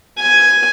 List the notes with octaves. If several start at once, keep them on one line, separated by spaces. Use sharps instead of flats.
G#5